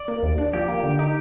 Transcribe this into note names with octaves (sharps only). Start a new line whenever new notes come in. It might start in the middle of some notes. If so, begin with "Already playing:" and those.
Already playing: D5
A#3
D#2
D4
F3 G4
A#3
D3
D#4